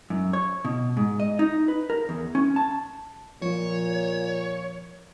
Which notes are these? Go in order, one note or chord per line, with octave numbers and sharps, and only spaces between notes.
F#2
C#5
B2
G#2
D#5
D#4
B4
A#4
E2
C#4
A5
A#2 F3 C#5